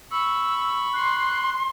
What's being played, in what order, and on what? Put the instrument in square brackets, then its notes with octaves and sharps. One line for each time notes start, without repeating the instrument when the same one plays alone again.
[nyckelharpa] B5 C#6 [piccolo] E6
[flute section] C6 [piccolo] F#6